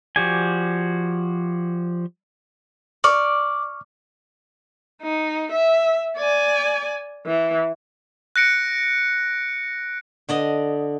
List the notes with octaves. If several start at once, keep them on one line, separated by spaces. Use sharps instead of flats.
F3 F#4 G4 D5 G#5
D5 C#6 F6
D#4
E5
D5 G#5
E3
F#6 A#6 C#7 D7
D3 D5 D#5